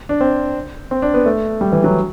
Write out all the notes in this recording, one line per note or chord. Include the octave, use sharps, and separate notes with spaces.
D4
C4
C4
D4
B3
A3
G3
E3
F#3